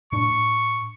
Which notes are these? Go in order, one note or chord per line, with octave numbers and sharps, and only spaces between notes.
A2 D4 C#6